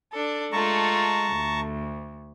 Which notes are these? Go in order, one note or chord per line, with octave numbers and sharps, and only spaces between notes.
D4 A4
G#3 A3 F4 A5 A#5 C#6
D2